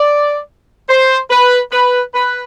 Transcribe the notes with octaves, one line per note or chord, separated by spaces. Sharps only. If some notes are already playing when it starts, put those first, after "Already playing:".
Already playing: D5
C5
B4
B4
B4